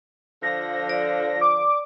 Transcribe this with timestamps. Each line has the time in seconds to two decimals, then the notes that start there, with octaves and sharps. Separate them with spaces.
0.43 D3 F3 A#6
0.89 D5
1.41 D6